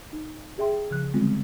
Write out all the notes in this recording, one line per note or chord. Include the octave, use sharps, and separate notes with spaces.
D#4
G4 G#4 E5 G5 C6
C#3 F3 F#6
D3 G3 G#3 B3 C4 F4